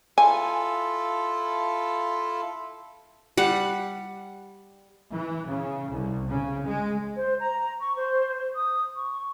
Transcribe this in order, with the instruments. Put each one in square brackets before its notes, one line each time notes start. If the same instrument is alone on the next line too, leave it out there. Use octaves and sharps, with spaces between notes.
[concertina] E4 F4 A4 [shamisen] G#5
[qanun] G3 F#5
[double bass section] E3
C#3
C2
C#3
G#3
[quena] C5
A#5
C#6
C5
D#6
C#6